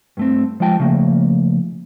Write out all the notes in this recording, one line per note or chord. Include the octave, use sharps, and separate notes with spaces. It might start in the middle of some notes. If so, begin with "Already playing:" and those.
G2 A3 C4
F3 G#3 F4 G5 A5
C#3 F3 A3 A#3